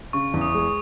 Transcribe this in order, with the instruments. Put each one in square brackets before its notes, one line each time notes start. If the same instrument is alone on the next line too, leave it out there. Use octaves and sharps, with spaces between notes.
[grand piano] C#3 [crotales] C#6
[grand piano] E2
[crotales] D#6
[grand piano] G#3